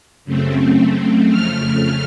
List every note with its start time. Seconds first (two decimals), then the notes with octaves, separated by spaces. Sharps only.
0.25 F#2 C#3 A3 C4
1.30 F2 C#3 A3 F6